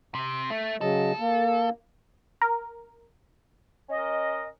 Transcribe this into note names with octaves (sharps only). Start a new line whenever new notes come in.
C3
A3
C#3 F#3 A4 D#5
A#3
A#4
C#4 A#4 D#5